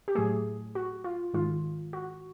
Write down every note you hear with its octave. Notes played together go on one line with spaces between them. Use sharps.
G4
A2 F#3 A3 G#4
F#4
F4
G#2 D#3 G#3 F4
F#4